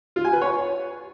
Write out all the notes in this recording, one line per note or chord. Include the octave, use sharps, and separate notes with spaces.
F4
G#5
B4
C#5